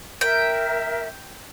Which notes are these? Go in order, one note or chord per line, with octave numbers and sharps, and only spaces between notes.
A#4 E5 G5